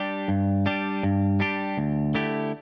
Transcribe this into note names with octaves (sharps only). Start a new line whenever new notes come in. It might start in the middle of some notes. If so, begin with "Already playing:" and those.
Already playing: G3 D4 G4
G2
G3 D4 G4
G2
G3 D4 G4
D2
D3 A3 E4 G4